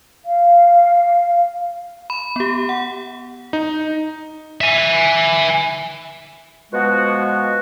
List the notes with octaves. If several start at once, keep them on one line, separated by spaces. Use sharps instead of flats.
F5
B5
B3 G4
F#5
D#4
E5 G#5
B2 F3 G#3 B3 F#4